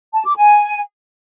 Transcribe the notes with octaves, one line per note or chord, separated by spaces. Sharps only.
A5
D6
G#5